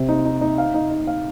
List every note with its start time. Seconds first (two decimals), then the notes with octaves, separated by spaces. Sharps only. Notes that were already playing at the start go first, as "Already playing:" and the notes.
Already playing: C3 C4
0.09 D#4
0.25 D#4
0.41 D#4
0.58 F5
0.74 D#4
0.91 D#4
1.07 F5